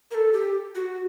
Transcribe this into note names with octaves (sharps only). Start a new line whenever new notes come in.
A#4
A4
G4
F#4